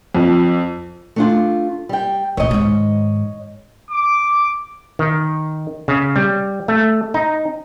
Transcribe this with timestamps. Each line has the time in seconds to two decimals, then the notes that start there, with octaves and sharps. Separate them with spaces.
0.15 F2
1.16 A3 D4 F4
1.89 G3 G5
2.37 A2 D#3 C#5 D#5
2.51 G#2 D#3
3.91 D6
4.99 D#3
5.88 C#3
6.16 G3
6.68 A3
7.14 D#4